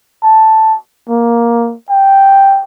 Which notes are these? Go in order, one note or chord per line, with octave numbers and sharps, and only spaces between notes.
A5
A#3
G5